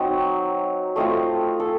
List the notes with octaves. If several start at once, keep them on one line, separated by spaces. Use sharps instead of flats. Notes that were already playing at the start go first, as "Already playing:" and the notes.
Already playing: F#3 C4 D#4 D#5
A3 C4 F4 D#5
A4